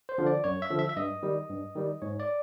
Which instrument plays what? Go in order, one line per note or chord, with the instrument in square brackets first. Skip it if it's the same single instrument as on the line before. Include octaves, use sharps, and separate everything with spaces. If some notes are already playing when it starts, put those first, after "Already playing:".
[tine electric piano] C5
D3 F3
D5
F#2 C#5
E5
D3 F3
E5
E5
G2 D#5
D#3 G3
G2
D#3 G3
G#2 C#5
D5